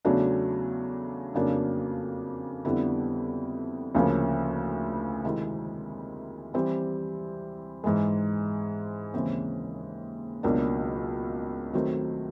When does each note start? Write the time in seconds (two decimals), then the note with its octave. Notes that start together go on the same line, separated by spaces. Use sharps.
0.05 E2 C#3 F#3 A3 D4
1.34 F2 C#3 F#3 A#3 D4
2.65 F2 D3 G3 B3 E4
3.95 D2 C#3 F3 A#3
5.25 C3 D#3 G#3 C4 E4
6.54 E3 G3 C4
7.84 G#2 E3 G#3
9.14 D#2 C#3 E3 G#3 C4
10.43 C#2 B2 F#3 A#3 D4
11.73 D#3 F#3 A3 C4